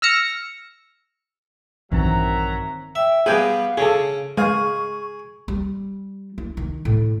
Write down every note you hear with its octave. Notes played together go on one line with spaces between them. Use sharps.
E6 F6 A#6 C#7
A#1 G2 D#3 E3 F#3 C4 E5 A#5
E5 G5
G3 B3 G#4 B4 F5 G5 G#5
C#3 C#4 G#4 A4
G#3 G#4 F5 C#6
G3
E4
D#3
A2